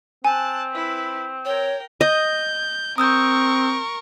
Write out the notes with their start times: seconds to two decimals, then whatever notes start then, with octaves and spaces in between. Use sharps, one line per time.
0.25 C4 G#5 A5 F#6
0.72 E4 B4
1.45 A#4 C#5 G5
2.01 D#5 G6
2.98 C4 A#4 C#6 D#6 E6 G6